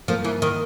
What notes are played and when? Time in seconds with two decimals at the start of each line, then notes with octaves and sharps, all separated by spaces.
0.08 F3 A#3
0.25 E3
0.42 D#3